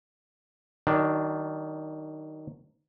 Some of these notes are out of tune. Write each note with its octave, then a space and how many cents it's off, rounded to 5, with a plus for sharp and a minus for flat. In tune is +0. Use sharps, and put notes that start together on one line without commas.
D#3 +0 F#3 +40 D4 +0